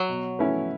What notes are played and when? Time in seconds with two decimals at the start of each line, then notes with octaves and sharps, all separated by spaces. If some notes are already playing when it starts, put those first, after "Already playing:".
Already playing: F#3
0.09 B2
0.39 A3 C#4 E4 B4